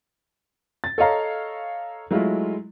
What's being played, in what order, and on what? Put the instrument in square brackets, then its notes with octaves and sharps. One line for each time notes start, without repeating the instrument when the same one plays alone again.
[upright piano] A6
A4 C#5 D#5 F5 A#5
F#3 G#3 A3 E4 F4